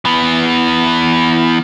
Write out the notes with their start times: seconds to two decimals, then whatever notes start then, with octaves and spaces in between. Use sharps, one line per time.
0.05 E3 B3